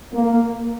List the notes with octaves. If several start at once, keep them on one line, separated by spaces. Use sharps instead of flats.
A#3